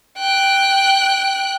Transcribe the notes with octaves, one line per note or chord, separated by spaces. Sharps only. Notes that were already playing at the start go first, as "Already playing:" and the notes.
G5 F#6